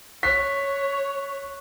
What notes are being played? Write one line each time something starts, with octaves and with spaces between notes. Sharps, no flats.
C#5 C#6 F#6 B6